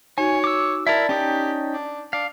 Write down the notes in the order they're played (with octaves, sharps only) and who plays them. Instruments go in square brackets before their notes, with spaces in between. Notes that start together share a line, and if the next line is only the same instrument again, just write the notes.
[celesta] D#4 F#4 [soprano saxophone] C#5 [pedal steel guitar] G#5
[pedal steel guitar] D6 E6
[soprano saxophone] E4 [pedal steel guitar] A#4 E5 [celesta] D5 A5 A6
[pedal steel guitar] C#4 D#4 G5 [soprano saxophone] G4
[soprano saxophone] D4
[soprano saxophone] D4 [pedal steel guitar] F5